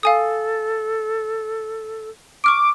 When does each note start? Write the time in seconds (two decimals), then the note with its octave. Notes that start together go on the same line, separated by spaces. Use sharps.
0.03 A4 F5 G#5 D#6
2.44 C#6 D6 F6 D7